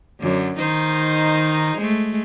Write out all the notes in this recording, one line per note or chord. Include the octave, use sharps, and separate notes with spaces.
F#2 D3
D#3 D#4 C5
G#3 A3